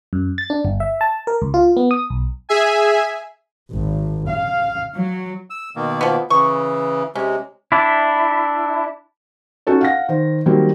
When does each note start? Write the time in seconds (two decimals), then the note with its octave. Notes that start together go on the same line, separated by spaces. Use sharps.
0.13 F#2
0.38 A6
0.50 D4
0.65 G1
0.80 E5
1.01 A5
1.27 A#4
1.42 C#2
1.54 F4
1.77 B3
1.91 D#6
2.10 B1
2.49 G#4 E5 G#5
3.72 G#1
4.28 F5
4.95 F#3
5.50 E6
5.76 B2 D#3 A#3
6.01 F3 B3
6.30 C#3 E3 C#6
7.15 C3 G#3 C#4
7.72 D4 E4
9.67 C#4 D#4 F#4 A4 C#5
9.81 F5 F#5 A#6
10.09 D#3 C5
10.46 D#3 F#3 G3 A#3 C4